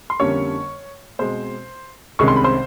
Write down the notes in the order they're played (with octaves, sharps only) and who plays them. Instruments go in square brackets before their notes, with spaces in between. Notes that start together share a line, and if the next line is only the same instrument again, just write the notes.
[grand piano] C6
F2 D3 G3 A#3 C#4 C#5 C#6
B2 G#3 C4 C5 C6
C2 C3 D#3 G#3 C#4 C#6
C6
B5
C5 C6